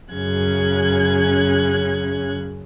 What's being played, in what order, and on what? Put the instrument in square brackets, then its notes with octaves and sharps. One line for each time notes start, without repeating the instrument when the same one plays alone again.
[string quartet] F#2 C#3 C#4 G#4 F#6 G#6